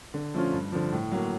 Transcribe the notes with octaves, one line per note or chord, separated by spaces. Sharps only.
D3
F3 A3 C#4 F4
G2
D3 F3
A2
F#3 A#3